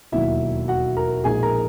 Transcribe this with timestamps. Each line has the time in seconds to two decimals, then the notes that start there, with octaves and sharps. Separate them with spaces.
0.12 E1 D#2 D#3 F#3 E4 E5
0.68 F#4 F#5
0.97 A#4 A#5
1.24 A#1 A#2 G#3 D#4 G#4 G#5
1.43 A#4 A#5